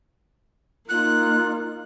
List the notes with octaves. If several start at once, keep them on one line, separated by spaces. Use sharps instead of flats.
A#3 D#4 F4 F#6